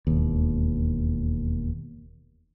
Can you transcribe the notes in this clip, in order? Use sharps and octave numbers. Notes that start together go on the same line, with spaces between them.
E1 D#2